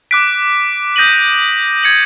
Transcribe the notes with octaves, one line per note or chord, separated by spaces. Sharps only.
D6 F#6 B6 D7
D#6 G6 A#6 D#7 F#7
G#6 C#7 F#7